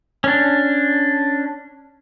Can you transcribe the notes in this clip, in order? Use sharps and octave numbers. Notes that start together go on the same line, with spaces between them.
C#4 D4